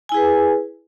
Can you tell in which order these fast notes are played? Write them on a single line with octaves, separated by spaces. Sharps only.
G#5 E4 G#4 B4